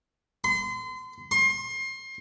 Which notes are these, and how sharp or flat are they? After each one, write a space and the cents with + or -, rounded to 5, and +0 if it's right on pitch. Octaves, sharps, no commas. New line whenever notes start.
C6 -35
C6 +30